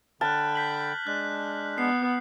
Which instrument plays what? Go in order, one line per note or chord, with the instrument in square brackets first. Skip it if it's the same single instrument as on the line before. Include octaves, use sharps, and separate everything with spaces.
[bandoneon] D3 G5 B5 [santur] A5 [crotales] F6 F#6
[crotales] G6 B6 F#7
[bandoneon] G#3 D4 [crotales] F#6
[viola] B3 [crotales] C7